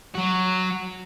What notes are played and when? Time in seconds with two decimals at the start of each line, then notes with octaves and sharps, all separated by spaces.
0.15 F#3 F#4